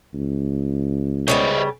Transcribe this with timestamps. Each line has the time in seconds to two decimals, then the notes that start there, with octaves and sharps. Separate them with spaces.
0.14 C#2
1.28 C#3 G3 B3 C5 C#5 D#5